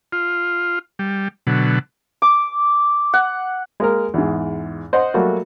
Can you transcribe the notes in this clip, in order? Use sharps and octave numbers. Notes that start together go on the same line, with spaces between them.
F4
G3
B2 D3 F#3
D6
F#5
G#3 A#3 A#4
E2 G#2
C5 D#5 F#5
F#3 G3 A3 A#3 F#4